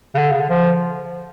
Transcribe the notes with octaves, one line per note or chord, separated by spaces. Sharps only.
C#3
D3
C#3
D3
F3